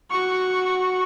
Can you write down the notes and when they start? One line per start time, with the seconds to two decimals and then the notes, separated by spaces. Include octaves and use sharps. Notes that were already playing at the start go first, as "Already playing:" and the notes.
0.11 F#4 C#6